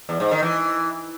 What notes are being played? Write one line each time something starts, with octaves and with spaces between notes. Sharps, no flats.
E2
G#2
D#3
E3